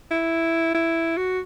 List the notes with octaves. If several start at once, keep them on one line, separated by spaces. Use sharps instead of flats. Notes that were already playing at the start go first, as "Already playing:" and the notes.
E4
E4
F#4